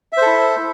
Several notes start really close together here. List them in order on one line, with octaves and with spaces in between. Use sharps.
E5 C5 A4 E4